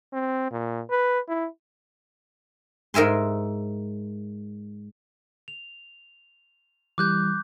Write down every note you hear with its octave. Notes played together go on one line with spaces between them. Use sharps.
C4
A#2
B4
E4
G#2 A#4 E5 G#5 C6
F7
E3 G3 D6 F#6 G6